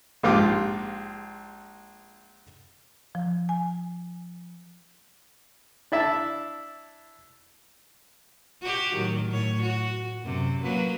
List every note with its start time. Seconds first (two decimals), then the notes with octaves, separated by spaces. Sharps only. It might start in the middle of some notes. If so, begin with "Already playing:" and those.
0.23 A#1 G#2 F4 G4 D6
3.15 F3
3.49 G#5
5.92 D4 E4 E5 A5
8.62 F#4 G4
8.96 A2 D#3 F#3
9.32 A2 C#5
9.62 F#4
10.21 F#2 C3
10.63 F#3 A#3 B4